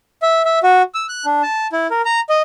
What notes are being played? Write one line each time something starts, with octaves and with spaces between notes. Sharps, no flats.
E5
E5
F#4
E6
F#6
D4
A5
E4
A#4
A#5
D#5